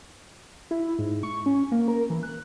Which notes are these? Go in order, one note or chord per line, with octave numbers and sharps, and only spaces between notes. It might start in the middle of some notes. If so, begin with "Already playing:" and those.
E4
G#2
C#6
C#4
A#3
A#4
E3
F#6